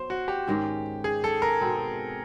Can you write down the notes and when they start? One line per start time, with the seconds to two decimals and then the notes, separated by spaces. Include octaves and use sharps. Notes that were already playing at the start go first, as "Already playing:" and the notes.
Already playing: F#3 B3 C5
0.10 F#4
0.28 G4
0.47 G#2 D#3 G#3 C#4
1.04 G#4
1.24 A4
1.42 A#4
1.61 B2 G#3 C4